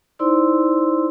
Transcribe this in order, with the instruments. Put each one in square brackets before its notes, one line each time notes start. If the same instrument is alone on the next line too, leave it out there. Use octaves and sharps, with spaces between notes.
[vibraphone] D#4 E4 C5 D5 C6 E6